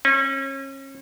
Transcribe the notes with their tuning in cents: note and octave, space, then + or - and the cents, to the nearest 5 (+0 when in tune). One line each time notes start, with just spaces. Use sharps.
C#4 -35